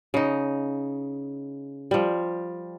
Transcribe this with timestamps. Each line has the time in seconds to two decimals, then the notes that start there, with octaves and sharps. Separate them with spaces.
0.14 C#3 D#4
1.91 F3 G3